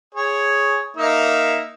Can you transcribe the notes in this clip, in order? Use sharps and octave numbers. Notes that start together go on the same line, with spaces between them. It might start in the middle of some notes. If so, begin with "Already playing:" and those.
G#4 C#5
A#3 D#4 E5